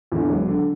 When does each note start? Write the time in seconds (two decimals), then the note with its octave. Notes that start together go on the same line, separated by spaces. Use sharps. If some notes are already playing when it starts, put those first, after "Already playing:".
0.12 E2 D3
0.29 E1 F#3
0.48 D3